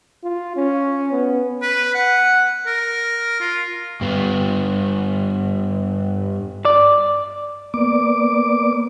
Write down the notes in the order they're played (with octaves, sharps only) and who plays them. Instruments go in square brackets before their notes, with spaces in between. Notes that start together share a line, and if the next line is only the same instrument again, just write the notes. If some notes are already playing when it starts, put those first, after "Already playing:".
[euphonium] F4
C#4
B3
[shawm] B4
F#5
A#4
F4
[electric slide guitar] G2 B3
[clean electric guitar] D5
[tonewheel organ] A#3 B3 D5 D6